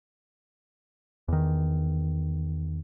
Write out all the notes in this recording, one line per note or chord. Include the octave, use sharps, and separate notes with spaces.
E2 D#3